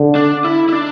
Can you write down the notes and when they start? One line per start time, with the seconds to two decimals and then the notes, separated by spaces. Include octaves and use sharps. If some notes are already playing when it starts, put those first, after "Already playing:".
Already playing: D3
0.15 D4
0.44 E4
0.68 E4
0.72 D4